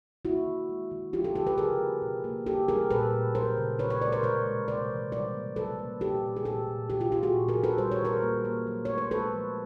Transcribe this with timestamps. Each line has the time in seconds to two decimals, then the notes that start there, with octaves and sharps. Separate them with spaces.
0.25 A#3 E4 F#4
0.46 D#3
0.69 G#3
0.91 D#3
1.13 F3 F4 G4
1.24 G4 A4
1.35 D3 G4 A4
1.47 A4 B4
1.58 C#3 G#4 A#4
1.80 A#3
2.02 B2
2.24 A#3
2.46 A#3 G4 A4
2.68 G3 G#4 A#4
2.90 A#2 A4 B4
3.13 A#2
3.35 F#3 A#4 C5
3.57 C#3
3.79 D#3 B4 C#5
3.90 B4 C#5
4.01 G#3 C5 D5
4.12 A#4 C5
4.23 B2 B4 C#5
4.46 G#3
4.68 C3 C5 D5
4.90 E3
5.12 G3 C5 D5
5.34 A#3
5.56 F#3 A4 B4
5.79 A#3
6.01 A#2 G4 A4
6.23 A#2
6.36 G#4
6.45 A#2 G4 A4
6.67 A#2
6.90 D#3 G4 A4
7.01 F4 G4
7.12 D#3 F4 G4
7.23 F#4 G#4
7.34 A#2
7.48 G#4 A#4
7.56 F#3
7.64 A4 B4
7.78 G3 C5
7.92 C#5
8.00 D#3 A#4 C5
8.22 A#3
8.45 A#3
8.67 F#3
8.85 A3 C#5
8.98 C5
9.11 G#3 A4 B4
9.34 F3